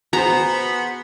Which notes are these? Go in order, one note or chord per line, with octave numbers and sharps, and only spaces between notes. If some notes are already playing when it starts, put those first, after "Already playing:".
B3 F#4 G#4 C5 A#5